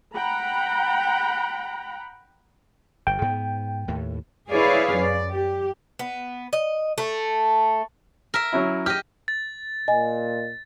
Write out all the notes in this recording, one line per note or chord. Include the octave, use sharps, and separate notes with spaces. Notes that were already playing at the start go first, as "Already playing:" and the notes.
F#5 G5 A#5 B5
G1 G5
G#2 B3
D#2 A2
E4 G#4 B4 C#5 D5 F5
F#2 D5
G4
B3
D#5
A3
A#4 E5
F#3 C#4 E4
G4 D#5 F6
A6
A#2 D#5 G#5